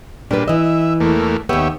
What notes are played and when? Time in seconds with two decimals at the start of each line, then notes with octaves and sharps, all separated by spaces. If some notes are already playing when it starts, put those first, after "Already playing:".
0.31 A#2 G3 D4 B4
0.48 E3 D#5 E5
1.00 E2 A3 A#3
1.49 D#2 B3 G4 C#5 E5